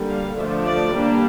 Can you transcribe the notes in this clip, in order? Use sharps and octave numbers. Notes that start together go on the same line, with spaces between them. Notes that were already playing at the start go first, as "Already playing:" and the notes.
Already playing: D3 G3 A#3
F5
D3 F3 A3 D4 E5
D5
G3 A#3 D4